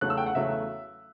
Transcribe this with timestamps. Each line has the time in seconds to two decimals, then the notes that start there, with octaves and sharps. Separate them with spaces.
0.01 E2 C#3 F#3 A3 F#6
0.10 E6
0.17 G5
0.26 F#5
0.35 E2 C#3 F#3 A3 E5